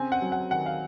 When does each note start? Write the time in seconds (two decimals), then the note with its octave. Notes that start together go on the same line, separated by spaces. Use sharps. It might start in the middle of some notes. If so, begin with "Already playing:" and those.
Already playing: C#3 C4 G#5
0.12 F#5
0.21 F#3
0.32 F#5
0.51 D#3 F#5
0.66 F5